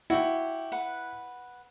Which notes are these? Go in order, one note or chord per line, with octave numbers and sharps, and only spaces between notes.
E4 F#4 G4
B4 F#5